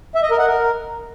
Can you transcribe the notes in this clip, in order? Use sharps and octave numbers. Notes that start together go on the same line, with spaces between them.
E5
D#5
A#4
F#5
A#4